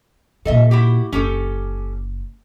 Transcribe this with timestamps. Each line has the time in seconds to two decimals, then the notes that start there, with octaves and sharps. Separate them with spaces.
0.45 A#2 C#3 A4 D#5 E5
0.71 E4 F#4 G4
1.12 F#1 C#4 G4 A4